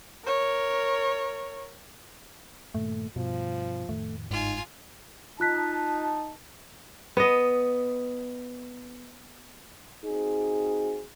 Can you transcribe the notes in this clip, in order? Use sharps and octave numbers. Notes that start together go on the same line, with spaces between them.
A#4 C#5
G2 A#2 D#3 A3
G2 B2 F3
F2 A2 D#3 A3
G1 G#2 D#4 F4 G#5
D#4 F4 A5 F#6 B6
B3 D#5
C4 D#4 F#4 G#4